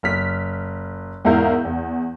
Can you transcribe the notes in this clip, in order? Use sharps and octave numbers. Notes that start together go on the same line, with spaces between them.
F#1 F6 B6
E2 G#2 E4 A#4 F5 G6
E2